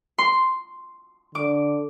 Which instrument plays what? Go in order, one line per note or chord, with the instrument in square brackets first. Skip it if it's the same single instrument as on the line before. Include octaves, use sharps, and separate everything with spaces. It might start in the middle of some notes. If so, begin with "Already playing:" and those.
[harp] C6
[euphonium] D3 [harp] D6